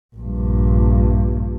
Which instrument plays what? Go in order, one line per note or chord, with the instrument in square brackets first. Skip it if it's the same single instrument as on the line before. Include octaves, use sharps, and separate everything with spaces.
[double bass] A#1 G2